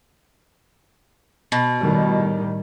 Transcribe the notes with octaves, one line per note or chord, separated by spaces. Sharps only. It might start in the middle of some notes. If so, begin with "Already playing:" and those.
B2
A2 D#3 G3